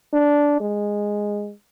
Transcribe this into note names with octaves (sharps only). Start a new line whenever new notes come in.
D4
G#3